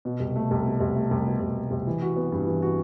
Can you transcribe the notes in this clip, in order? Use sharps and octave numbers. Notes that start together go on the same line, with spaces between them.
B2
C2
A3
C2
B2
C2
A3
C2
B2
C2
A3
C2
E3
F#4
B3
G2
E3
F#4